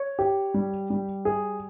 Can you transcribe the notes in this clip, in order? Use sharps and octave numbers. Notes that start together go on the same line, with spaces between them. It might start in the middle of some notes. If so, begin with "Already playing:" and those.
Already playing: C#5
G4
G3
G3
G#4